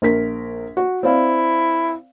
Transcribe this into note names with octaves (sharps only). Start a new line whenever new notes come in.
A#1 A#4 B6
F#4
C4 E4 D5 F5